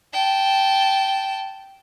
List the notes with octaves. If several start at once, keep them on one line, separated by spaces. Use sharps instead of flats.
G5 A5